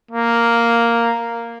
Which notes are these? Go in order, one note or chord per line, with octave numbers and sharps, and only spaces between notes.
A#3